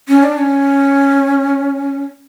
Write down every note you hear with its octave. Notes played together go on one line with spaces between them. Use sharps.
C#4
D4
C#4